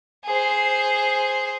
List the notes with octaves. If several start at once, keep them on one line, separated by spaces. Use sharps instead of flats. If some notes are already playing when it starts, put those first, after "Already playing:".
G#4 C5